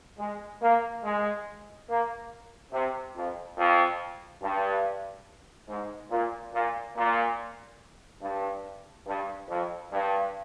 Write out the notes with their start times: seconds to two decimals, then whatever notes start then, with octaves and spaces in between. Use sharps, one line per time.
0.19 G#3
0.62 A#3
1.03 G#3
1.89 A#3
2.72 C3
3.16 F2
3.57 F2
4.42 G2
5.68 G#2
6.10 A#2
6.53 A#2
6.96 A#2
8.22 G2
9.07 G2
9.49 F2
9.91 G2